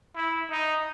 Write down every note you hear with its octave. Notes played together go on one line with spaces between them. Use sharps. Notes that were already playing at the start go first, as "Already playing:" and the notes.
E4
D#4